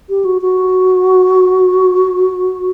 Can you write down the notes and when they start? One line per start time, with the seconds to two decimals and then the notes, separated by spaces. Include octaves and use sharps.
0.09 G4
0.25 F#4
0.42 F#4